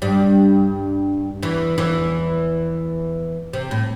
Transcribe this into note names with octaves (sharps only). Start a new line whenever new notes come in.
G2 G3
E2 E3
E2 E3
C3
A2